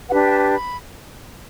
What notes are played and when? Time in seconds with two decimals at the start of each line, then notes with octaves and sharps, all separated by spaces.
0.09 D4 G4 B4 F#5
0.25 G5
0.30 A5
0.52 B5